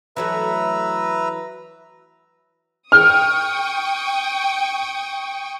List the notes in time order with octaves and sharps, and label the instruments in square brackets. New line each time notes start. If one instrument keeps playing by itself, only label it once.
[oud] E3 F#3 A3 [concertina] B4 E5 A#5
[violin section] G5 C#6 D#6 [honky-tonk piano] F6